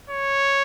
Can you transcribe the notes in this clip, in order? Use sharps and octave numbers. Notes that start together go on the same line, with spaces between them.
C#5